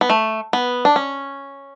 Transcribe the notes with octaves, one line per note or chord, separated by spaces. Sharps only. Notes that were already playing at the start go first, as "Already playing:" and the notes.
B3
A3
B3
D4
C#4